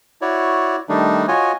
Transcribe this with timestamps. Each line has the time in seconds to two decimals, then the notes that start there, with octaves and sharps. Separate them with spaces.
0.22 E4 F#4 C#5 D5
0.89 D#3 G3 A3 D4 D#4
1.28 F4 F#4 C#5 D#5 G#5